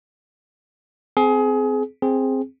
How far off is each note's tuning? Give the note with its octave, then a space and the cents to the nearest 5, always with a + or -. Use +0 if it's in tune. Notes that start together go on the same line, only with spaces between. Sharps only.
C4 -20 G#4 +25
C4 +5 G#4 +0